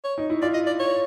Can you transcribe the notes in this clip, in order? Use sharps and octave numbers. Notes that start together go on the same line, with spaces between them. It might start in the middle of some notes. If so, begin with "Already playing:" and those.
C#5
D#4
E4
F4 D5
D#5
D5
C#5